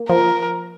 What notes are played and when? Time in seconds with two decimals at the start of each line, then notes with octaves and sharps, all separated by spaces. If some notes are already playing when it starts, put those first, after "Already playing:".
Already playing: A#3
0.09 F3 A#4